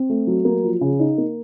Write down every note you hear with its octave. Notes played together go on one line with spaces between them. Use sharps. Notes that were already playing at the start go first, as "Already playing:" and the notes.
Already playing: C4
A3
F#3
A#3
F3
C#3
D#4
A#3